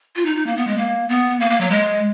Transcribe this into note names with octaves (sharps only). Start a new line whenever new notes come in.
F4
D#4
D#4
A#3
B3
G#3
A#3
B3
A#3
A#3
F#3
G#3